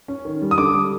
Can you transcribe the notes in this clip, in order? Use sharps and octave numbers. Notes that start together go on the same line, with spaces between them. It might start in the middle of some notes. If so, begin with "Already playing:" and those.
C#4
D#3
G3
D#6
D3 D6
G3